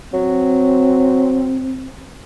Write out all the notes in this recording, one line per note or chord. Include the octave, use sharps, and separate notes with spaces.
F#3 C4